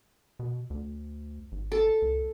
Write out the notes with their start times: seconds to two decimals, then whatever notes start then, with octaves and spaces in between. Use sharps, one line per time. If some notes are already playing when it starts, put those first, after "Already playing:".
0.39 B2
0.70 D2
1.52 G#1
1.72 A4
2.02 C#2